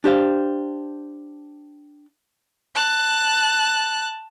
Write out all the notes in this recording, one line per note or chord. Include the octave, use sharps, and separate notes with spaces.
D4 G4 C5 F5
A5 F#6